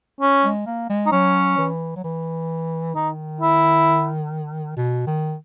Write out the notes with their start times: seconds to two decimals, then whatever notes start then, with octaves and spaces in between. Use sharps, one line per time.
0.21 C#4
0.45 G#3
0.66 A#3
0.90 G#3
1.06 D#4
1.12 F#3 C#4
1.58 E3
1.96 F#3
2.04 E3
2.95 D#3 D#4
3.41 E4
4.77 B2
5.07 D#3